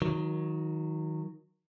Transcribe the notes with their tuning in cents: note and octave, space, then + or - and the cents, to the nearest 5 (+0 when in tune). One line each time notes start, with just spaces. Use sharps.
D#3 +20 F#3 -15